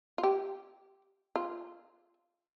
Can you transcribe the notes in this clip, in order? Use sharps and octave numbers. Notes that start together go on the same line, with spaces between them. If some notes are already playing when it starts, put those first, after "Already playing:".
F4
G4
F4